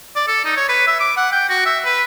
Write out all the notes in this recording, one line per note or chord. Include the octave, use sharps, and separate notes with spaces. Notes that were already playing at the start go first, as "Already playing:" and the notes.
D5
A4
D#4
C#5
B4
E5
D6
F#5
G5
F#4
E5
B4